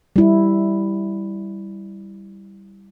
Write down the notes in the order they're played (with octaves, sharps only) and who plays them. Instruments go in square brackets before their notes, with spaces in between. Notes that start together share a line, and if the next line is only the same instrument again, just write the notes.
[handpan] G3 E4